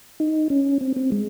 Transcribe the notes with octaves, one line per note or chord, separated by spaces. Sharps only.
D#4
C#4
C4
C4
G#3